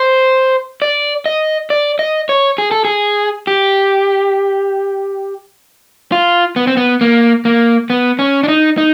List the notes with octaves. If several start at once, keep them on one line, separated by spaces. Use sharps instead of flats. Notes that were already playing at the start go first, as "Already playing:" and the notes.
Already playing: C5
D5
D#5
D5
D#5
C#5
G#4
A4
G#4
G4
F4
B3
C4
B3
A#3
A#3
B3
C#4
D4
D#4
D#4